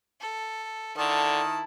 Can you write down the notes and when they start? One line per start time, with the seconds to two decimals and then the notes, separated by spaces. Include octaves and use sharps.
0.21 A4
0.97 D3 D#3 E4 A5